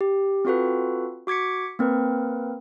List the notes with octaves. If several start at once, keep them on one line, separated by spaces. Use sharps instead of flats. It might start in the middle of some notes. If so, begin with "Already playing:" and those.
G4
C4 F4 F#4 A4 B4
F#4 D6 G#6 B6 C#7
A#3 C4 A#4 B4